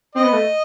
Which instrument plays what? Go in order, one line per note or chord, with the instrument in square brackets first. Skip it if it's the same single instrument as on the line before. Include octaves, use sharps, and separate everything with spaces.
[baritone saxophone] C4 [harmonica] D#5
[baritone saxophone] B3
A3